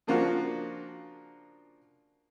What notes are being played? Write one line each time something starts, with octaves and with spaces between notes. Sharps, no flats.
C#3 F3 A#3 D4 F4 F#4